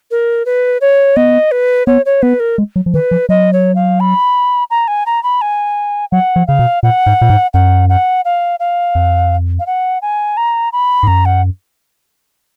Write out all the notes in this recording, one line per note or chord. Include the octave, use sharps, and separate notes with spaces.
A#4
B4
C#5
B3 D#5
B4
B3 C#5
C#5
B3 B4
A#4
G#3
F#3
F3
D#3 B4
F3
F#3 D#5
C#5
F5
B5
A#5
G#5
A#5
B5
G#5
F#3 F#5
F3
C#3 F5
B2
A#2 F#5
G#2
A#2
G#2
F#2 F#5
F#5
F5
F5
F2
F5
F#5
G#5
A#5
B5
G#2
F#2 A#5
F#5